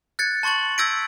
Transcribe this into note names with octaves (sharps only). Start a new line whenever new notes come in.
F#6 G#6 A6 C#7
A5 C6 C#6 A6 F#7
E6 G6 G#6 A#6 B6 D7